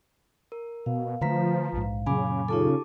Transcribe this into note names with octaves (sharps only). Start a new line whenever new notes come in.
A#4
B2 F5
D3 F3 A3 B4 A#5 B6
A#1 G#2
F#2 A#2 C#3 F#3 G#5 B5 D6
C#3 D#4 F4 G4 A4 A5 D6